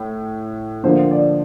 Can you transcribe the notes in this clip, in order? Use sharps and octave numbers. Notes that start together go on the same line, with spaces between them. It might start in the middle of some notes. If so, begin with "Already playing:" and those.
Already playing: A2
D3 F3 A#3 C5
D5